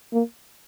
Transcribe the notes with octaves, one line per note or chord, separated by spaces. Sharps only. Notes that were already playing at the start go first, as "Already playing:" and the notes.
A#3